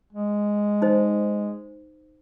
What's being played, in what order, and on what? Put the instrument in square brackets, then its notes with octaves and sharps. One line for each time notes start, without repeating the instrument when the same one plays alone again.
[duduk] G#3
[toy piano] D#4 C5